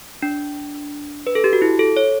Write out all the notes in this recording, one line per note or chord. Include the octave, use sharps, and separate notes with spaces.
D4
B4
A4
G4
F#4
E4
A4
C#5